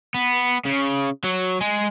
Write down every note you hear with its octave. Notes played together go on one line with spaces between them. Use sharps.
B3
C#3
F#3
G#3